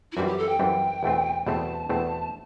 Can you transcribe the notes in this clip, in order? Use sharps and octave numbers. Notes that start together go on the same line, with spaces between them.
E4
F#2 E3 G3 C4 F#4
G4
A4
G5
F#2 E3 G3 C4
E2 B2 A3 C4
E2 B2 A3 C4 A5
E2 B2 A3 C4 A5